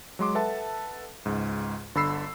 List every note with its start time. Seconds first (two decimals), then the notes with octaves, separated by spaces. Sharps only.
0.19 F#3 G#3 C6 D6
0.35 A4 B4 E5 F#5 A5
1.26 C#2 G#2
1.95 G1 D3 A4 B5 E6 C7